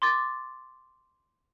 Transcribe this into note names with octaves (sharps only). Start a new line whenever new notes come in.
C6 D6 A6